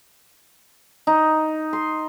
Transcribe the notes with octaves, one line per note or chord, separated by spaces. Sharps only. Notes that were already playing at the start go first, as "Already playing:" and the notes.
D#4
C6